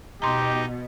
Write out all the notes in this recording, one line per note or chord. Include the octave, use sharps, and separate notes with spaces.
B2 D#4 G4 A#5 C6